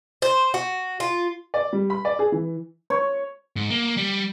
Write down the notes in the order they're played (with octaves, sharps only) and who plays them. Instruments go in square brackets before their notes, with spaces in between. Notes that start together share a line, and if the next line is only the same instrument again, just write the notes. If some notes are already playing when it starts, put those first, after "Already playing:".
[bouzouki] C5
F#4
F4
[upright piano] D5
G3
B5
D5
G#4
E3
[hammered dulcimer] C#5
[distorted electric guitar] G#2
A#3
G3